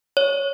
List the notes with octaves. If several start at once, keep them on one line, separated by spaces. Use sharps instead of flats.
C#5